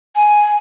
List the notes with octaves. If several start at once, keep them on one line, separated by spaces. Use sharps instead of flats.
G#5